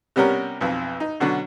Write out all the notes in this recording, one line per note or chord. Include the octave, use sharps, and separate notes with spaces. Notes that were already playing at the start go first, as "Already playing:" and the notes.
C3 G3 B3 C#4 A#4
B1 F2
D#4
B2 D3 F#3 C#4